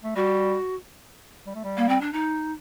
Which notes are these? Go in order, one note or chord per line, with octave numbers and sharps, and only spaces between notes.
A3
G3 F#4
G3
A3
G3
A#3
C4
D4
D#4